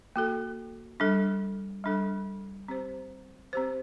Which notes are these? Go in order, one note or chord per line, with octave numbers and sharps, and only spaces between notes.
A#3 F#4 A4
G3 D4 A4
G3 D4 A4
C4 G4 C5
C4 G4 C5